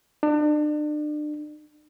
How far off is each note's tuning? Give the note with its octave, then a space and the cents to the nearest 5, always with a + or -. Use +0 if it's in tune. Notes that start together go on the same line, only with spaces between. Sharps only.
D4 +35